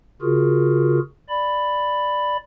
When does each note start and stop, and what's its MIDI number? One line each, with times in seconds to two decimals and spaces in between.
0.22 0.99 49
0.22 0.99 65
0.22 0.99 66
0.22 0.99 68
0.22 0.99 70
1.29 2.37 74
1.29 2.37 83